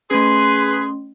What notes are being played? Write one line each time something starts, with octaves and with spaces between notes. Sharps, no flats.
A3 C#4 G#4 B4 C6